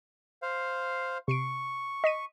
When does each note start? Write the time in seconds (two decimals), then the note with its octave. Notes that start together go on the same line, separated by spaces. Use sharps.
0.42 C5 F5
1.28 C3 C#6 C7 D7
2.04 D#5 B6 D#7